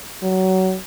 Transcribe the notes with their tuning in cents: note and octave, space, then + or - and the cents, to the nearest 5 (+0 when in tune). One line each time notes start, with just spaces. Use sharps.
F#3 +20